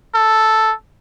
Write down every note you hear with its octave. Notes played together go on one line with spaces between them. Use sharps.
A4